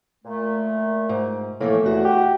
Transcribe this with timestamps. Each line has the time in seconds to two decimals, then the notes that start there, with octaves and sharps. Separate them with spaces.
0.25 A#2 A3
1.09 G#2
1.60 A2 E3 F3 A3 A#3
1.86 E2 F#4
2.05 G4